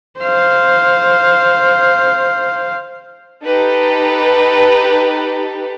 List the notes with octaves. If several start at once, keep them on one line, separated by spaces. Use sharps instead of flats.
C5 F5
D#4 G4 A4 B4